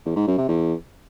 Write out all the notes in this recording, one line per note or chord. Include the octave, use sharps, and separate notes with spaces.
E2
G#2
F#2
C3
E2